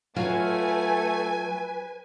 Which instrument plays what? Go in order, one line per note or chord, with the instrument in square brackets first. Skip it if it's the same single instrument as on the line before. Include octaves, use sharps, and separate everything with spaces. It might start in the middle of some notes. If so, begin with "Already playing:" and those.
[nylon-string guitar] F#3 F4 F5 [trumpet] A3 [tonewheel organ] B4 [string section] G#5